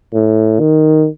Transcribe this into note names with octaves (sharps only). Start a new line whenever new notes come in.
A2
D#3